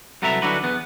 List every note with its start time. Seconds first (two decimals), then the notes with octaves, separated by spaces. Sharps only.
0.22 C2 F#3 A4 B4 E5 A#5
0.42 D3 E3 F#3 D4 F#4 B4
0.64 E2 B3